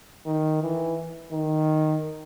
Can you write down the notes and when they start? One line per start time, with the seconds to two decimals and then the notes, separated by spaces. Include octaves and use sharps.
0.26 D#3
0.62 E3
1.32 D#3